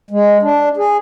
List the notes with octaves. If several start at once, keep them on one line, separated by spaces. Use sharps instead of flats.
G#3
D4
G#4